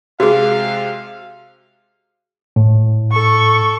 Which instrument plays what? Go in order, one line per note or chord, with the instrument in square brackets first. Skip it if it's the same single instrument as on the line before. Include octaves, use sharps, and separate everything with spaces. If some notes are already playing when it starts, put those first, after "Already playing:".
[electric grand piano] C3 G#3 [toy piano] F#4 G#4 [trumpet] F5
[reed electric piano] A2
[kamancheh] A4 C#6